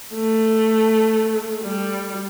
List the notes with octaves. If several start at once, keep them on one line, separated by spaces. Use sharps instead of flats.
A3
G3